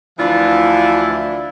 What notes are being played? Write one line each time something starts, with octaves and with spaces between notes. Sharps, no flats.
D2 E3 F3 D4 E4 F4